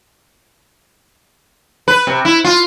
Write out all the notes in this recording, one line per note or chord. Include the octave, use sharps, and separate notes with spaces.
B4
C3
E4
F4